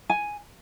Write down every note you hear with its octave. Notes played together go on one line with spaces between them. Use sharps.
G#5